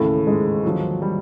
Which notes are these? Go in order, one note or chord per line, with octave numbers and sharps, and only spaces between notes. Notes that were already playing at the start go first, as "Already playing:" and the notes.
Already playing: D#2 A2 C#3 E3 A3
G#2 G#3
D#2 D3 F3 F#3
G3